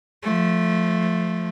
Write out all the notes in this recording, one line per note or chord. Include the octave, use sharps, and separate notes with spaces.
F3 A3